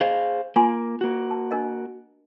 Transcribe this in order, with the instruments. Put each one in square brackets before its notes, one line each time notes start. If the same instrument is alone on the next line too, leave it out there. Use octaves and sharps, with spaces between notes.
[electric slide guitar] G#4 C5 F5 [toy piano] D#5
[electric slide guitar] A#3 [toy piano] F4 G#5 C6
[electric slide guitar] A#3 F#4
[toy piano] A5
D4 A#4 D#5